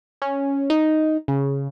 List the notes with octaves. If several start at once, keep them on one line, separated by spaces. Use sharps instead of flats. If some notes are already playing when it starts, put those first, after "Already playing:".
C#4
D#4
C#3